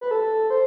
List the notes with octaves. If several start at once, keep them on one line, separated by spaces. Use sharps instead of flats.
B4
A4
C5